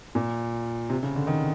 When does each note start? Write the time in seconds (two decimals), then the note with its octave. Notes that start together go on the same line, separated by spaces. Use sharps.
0.15 A#2
0.90 C3
1.03 C#3
1.15 D3
1.27 D#3